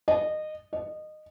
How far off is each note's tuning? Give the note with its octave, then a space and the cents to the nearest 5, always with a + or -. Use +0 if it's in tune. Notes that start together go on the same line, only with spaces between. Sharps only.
D#5 -20
D#5 -20